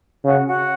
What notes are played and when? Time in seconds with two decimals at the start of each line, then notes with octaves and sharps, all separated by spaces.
0.24 C#3 F#4
0.46 F#4